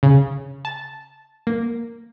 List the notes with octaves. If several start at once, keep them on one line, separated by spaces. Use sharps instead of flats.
C#3
A5
A#3